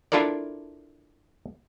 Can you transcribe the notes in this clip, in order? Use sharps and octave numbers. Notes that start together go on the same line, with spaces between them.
D4 E4 F4 A4 A#4 D5